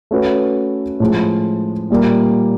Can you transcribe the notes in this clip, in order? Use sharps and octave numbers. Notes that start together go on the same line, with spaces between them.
A3 C#4 F#4 B4
A2 F3 G#3
A#2 G3 A#3